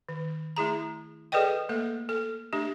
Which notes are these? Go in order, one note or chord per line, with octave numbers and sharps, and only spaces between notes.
D#3
A3 E4 G#4 A#5
G#4 A4 B4 D5 D#5 G5
A3 A#3 A4
A4
A3 D4 G4